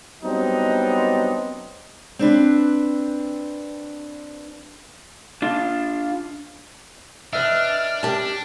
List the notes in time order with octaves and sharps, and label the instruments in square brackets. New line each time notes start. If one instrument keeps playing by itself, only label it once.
[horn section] F#3 G3 B3 C4 D4 D#4
[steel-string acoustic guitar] C4 D4 B4
[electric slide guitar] D4 F4
[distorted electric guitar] D4 [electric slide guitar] B4 D#5 E5 [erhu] F6
[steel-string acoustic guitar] G4 A5